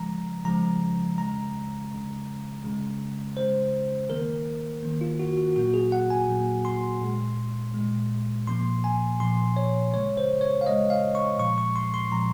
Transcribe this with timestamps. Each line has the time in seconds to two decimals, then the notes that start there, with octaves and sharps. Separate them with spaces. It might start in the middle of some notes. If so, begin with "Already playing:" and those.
Already playing: C#3 F3 G#3 A#5
0.45 C#3 F3 G#3 A#5
1.18 C#3 G#3 A#5
1.92 C#3 G#3
2.64 C#3 G#3
3.37 C#3 G#3 C5
4.09 D#3 A#3 A#4
4.83 D#3 A#3
5.01 F4
5.19 F#4
5.37 F#4
5.56 A#2 F#3 A#3 F#4
5.74 G#4
5.92 F#5
6.10 G#5
6.28 A#2 F#3 A#3
6.65 C6
7.01 A#2 G#3
7.74 A#2 G#3
8.47 A#2 F3 A#3 C6
8.84 G#5
9.20 A#2 F3 A#3 C6
9.57 C#5
9.93 C#3 G#3 C#5
10.17 C5
10.41 C#5
10.61 F5
10.66 C#3 G#3 D#5
10.90 F5
11.15 C#6
11.38 A#2 F3 G#3 C#6
11.58 C#6
11.76 C6
11.94 C6
12.11 A#2 F3 G#3 A#5